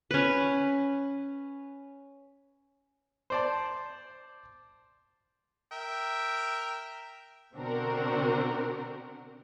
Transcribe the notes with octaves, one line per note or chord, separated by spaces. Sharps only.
C#4 B4
C5 D5 A5
A#4 E5 G5
B2 D3 C4 D4 F#4 A#4